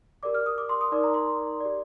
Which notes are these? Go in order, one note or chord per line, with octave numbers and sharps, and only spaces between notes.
G4 A#4 D5 D6
F6
D#6
D6
C6
D#6
D#4 A#4 D5 D6
A#5
C6
G4 D5